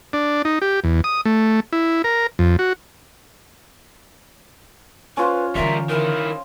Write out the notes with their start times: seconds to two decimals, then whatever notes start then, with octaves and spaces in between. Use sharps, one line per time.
0.13 D4
0.45 D#4
0.62 G4
0.84 E2
1.04 D#6
1.25 A3
1.73 E4
2.04 A#4
2.39 F2
2.59 F#4
5.17 C#4 F4 B4 C5
5.55 D3 E3 G3 A#4 E5
5.89 D#3 E4 A#4